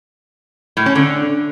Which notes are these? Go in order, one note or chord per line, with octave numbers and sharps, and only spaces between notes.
A2
C#4
D3